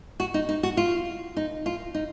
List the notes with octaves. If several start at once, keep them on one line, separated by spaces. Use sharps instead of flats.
F#4
D#4
D#4
F#4
F4
D#4
F4
D#4